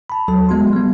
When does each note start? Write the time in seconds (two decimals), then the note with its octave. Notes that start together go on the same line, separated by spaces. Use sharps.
0.10 A5 B5
0.28 D#2 F#3 A4 A5
0.49 G#3 B3 F#4 C6
0.73 G3 B3